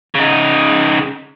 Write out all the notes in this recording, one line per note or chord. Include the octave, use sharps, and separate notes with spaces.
C#3 D#4